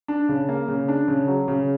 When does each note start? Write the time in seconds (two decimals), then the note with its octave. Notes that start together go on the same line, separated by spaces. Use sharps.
0.08 D4
0.29 C#3
0.49 A#3
0.68 C#3
0.88 D4
1.08 C#3
1.28 F#3
1.48 C#3